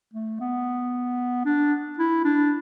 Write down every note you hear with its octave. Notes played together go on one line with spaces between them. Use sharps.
A3
B3
D4
E4
D4